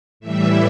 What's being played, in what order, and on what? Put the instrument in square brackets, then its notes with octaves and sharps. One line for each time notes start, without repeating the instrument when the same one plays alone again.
[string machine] A2 E3 G3 E5